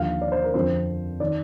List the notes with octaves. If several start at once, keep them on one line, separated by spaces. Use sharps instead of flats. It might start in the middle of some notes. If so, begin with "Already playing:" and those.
Already playing: D#2 D3 F3 F5
D5
C5
A#4
F2 D3 F3 C4 C5
D#3 D5